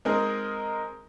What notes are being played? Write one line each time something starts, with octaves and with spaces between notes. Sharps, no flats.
G#3 C4 D#4 G#4 A#4